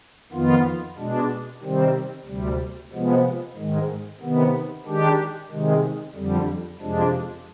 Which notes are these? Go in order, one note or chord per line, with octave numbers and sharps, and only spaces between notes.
F2 D#3 B3 F4
B2 G#3 D4
C3 D#3 G3 C4
D2 C3 G3
C3 F3 G#3 B3
G#2 D#3 G#3
C3 D#3 B3
D#3 G#3 D4 G4
C3 D#3 G#3
F2 D3 G3
F2 C3 F3 G#3 D4